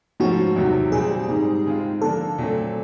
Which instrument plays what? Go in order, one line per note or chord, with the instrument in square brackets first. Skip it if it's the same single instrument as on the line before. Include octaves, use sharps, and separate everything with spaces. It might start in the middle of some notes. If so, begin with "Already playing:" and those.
[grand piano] G#2 F3 A3 C#4 [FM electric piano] F#4
[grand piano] E2 C3 D#3 F#3
[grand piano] A#2 G3 C4 [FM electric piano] G#4
[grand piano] G#2 D#3 G3
D#3 G#3 C4 F4
[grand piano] D3 F3 A#3 D4 [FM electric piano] A4
[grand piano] A#2 F#3 A3 C4